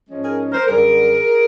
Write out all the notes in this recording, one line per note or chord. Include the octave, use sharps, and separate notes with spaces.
G#2 F3 G#3 C#4
G#4 A#4
A#4 C5
F#2 D3 G3 G#4 A#4